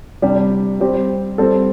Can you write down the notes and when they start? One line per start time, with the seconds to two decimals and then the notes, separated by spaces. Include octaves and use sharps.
0.22 C3 G3 D4 G4
0.80 G3 C4 G4
1.38 G3 C4 A4